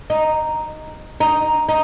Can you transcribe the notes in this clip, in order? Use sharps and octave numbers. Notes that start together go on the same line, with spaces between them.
D#4
D#4
D#4